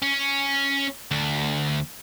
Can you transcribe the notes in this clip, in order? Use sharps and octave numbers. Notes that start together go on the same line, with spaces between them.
C#4
D2